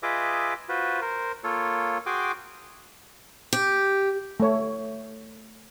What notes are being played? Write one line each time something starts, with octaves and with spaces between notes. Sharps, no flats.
F4 G#4 B4 D#5 E5 D6
F4 F#4 B4 C5
A#4 C5
A#3 F4 A4 C#5
F#4 G#4 G5 G#5 C6 D6
G4
A3 C#5